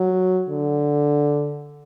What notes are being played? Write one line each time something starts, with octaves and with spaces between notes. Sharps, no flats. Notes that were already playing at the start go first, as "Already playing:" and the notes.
Already playing: F#3
D3